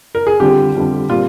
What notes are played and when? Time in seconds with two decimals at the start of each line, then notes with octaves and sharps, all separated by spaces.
0.15 A#4
0.27 G#4
0.40 F2 D3 G3 C4 F4 G4
0.75 F2 D3 G3 C4 F4
1.10 A#2 G3 C4 F4